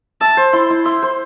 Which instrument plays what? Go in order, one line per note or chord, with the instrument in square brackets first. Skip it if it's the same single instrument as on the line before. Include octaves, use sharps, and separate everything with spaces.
[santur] E5 [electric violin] A5
[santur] C5
[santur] E4 [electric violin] C6
[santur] E4
[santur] E5 [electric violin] C6
[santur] C5